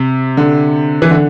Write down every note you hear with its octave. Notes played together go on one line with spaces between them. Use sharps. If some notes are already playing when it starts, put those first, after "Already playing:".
Already playing: C3
D3
E3
D3